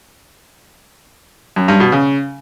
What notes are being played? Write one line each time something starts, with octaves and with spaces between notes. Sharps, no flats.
F#2
G2
B2
C#3